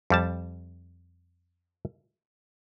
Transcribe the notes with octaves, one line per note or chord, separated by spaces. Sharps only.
F2 G3 A5